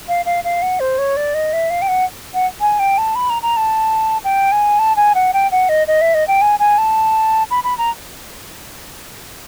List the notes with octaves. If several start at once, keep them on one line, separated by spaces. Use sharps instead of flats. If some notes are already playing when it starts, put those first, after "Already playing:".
F5
F5
F5
F#5
C5
C#5
D5
D#5
E5
F5
G5
F#5
F#5
G#5
G5
A5
B5
A#5
A#5
A5
G5
G#5
A5
G#5
F#5
G5
F#5
D#5
D#5
E5
D#5
G5
G#5
G#5
A5
B5
B5
A#5